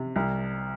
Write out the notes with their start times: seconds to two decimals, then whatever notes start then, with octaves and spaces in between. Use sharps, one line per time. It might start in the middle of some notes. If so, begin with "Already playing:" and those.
Already playing: C3
0.16 C2